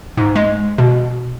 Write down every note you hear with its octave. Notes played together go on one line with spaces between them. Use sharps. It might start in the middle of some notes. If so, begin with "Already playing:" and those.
G#2
G#3
B2